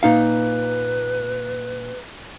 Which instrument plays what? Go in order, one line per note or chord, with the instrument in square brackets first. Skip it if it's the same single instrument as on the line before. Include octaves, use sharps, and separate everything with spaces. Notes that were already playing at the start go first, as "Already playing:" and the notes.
[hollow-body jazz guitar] A#2 D#4 F5 [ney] B4